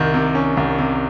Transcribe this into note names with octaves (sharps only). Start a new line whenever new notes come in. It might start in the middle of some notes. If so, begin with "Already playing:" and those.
Already playing: C2 D#3
C3
C#4
C2
C3